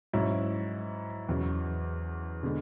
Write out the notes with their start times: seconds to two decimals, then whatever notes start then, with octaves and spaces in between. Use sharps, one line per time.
0.13 G#2 F#3 C#4 E4
1.29 E2 C#3 F#3
2.43 D3 G#3 B3